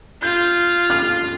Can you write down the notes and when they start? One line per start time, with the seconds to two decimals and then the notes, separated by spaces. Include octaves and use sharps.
0.22 F4 G6
0.90 F6